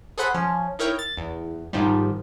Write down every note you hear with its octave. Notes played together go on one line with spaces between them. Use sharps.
G#4 A4 C5 F#5 B5
F3 C#4
D#4 E4 A#4 C#5 G5
A6
E2
G#2 D#3 F3 G3